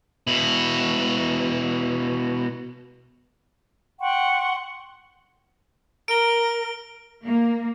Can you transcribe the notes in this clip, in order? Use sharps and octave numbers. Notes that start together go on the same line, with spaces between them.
B2 E4
F#5 G5 C6 C#6
A#4 D7 G7
A#3